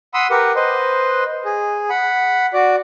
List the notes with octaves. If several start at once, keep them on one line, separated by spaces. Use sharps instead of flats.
F#5 B5 C6 D#6 E6
G4 A#4 B4 F#5
B4 C5 D#5
G#4
F#5 B5
F#4 D5